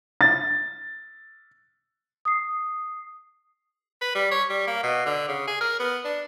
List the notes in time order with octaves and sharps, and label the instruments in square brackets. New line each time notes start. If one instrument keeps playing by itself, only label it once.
[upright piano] A6
[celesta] D#6 C7
[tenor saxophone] B4
G3
C#5
G3
A#3
B2
D3
C#3
G#4
A#4
B3
D4